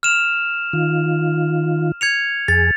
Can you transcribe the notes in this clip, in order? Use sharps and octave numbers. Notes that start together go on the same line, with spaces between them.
F6 E7 F7
D#3 F4
G#6 C#7 F7
F2 G#4 A6